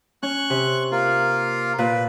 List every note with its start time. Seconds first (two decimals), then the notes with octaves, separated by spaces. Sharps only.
0.23 C#4 C#6 F#6
0.50 C3
0.92 A#3 F4
1.78 A#2 B4